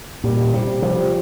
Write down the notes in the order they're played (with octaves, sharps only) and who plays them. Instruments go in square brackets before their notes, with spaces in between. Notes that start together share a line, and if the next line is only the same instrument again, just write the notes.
[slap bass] A#2 [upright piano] G3
[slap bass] C3 [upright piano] G3
[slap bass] F3 [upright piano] G3